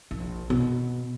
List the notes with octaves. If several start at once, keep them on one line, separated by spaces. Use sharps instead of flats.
A#1
B2